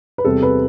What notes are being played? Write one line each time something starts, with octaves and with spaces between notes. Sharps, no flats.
B4
E2 C3 G3 C4 A4
B4